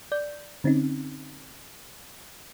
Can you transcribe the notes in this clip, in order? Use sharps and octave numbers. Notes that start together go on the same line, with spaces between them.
D5 G6
D3 C4 C#4 D#4